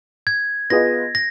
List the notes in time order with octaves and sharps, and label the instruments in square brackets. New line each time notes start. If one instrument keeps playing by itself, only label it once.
[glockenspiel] G#6
[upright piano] B3 F4 G#4 B4 D#5 [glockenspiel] A#6
[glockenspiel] A#6